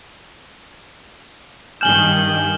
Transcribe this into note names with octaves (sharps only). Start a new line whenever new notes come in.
G2 D#3 G#5 F6 G6 E7 F#7 G7